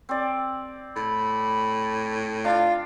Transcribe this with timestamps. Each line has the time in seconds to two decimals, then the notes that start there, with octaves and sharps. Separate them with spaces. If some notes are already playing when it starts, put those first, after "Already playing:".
0.09 C4 D5
0.96 A2 B5
2.45 D4 F4 F5